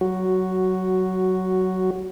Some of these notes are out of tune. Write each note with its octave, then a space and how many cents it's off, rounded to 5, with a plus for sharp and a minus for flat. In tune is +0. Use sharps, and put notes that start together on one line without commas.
F#3 +15 F#4 +0